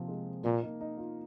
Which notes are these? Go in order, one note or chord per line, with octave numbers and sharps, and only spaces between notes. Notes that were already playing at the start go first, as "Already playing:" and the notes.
Already playing: C3 F3 A#3 C4
G#3
A#2 A#3
D#4
D#4
F4